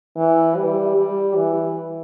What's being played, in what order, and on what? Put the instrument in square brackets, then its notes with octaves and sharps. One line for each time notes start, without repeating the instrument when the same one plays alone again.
[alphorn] E3
G3
G3
E3